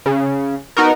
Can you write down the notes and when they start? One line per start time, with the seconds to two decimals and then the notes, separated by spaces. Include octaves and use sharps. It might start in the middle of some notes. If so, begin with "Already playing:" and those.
0.06 C#3
0.77 B3 D#4 F#4 A#4